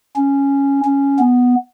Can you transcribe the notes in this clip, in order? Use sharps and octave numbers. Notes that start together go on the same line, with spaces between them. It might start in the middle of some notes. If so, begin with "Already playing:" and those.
C#4
C#4
B3